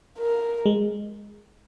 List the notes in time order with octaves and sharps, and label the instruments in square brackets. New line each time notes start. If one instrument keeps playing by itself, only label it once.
[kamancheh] A#4
[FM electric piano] G#3